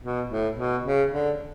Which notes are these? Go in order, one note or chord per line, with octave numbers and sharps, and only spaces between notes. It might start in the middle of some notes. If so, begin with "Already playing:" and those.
B2
A2
B2
C#3
D3